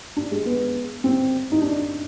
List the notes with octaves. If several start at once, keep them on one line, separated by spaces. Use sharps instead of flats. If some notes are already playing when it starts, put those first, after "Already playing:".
D4
G#3
B3
C4
D#4
D4